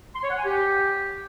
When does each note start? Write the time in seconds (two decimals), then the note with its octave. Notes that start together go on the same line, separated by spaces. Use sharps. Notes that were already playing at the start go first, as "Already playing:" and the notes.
0.16 C6
0.23 C#5
0.30 F#5
0.37 G#5
0.45 G4